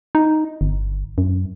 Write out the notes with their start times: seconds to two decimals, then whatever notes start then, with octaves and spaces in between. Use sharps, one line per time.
0.15 D#4
0.61 G1
1.18 F#2